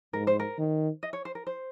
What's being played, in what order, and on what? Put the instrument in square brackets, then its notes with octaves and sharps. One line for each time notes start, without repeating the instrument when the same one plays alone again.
[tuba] G#2 [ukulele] A#4
[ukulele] C5
A#4
[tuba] D#3
[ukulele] D#5
C#5
C5
A#4
C5